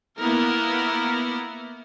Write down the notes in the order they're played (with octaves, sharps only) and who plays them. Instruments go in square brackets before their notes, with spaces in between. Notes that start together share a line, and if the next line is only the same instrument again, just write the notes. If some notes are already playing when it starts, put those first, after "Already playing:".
[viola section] A#3 B3 E4 A#4